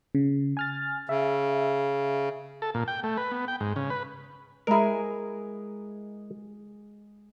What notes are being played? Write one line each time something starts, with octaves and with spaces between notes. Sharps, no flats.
C#3
G#5 F6 A6
C#3 E5
A4
A#2
G5
A3
B4
B3
G5
G#2
C#3
B4
G#3 E4 G#4 A#4